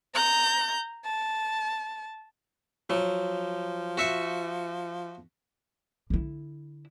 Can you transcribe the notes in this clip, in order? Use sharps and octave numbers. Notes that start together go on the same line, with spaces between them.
A#5 G6
A5
F3 F#3
F#4 E5 C#6
D3 E4